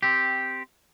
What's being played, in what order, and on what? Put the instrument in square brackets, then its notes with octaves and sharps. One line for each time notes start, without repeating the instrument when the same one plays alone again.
[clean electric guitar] C4 G4